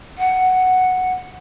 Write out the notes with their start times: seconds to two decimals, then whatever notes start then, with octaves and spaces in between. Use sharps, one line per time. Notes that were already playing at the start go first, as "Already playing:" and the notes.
0.18 F#5